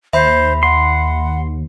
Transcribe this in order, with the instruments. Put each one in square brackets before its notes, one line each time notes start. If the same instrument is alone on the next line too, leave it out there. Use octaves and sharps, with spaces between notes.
[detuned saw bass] D#2 [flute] C5 [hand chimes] E5 B5
[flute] F#5 [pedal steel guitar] C6